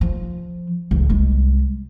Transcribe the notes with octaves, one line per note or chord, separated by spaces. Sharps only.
F3
D1 C#2
C2 G#3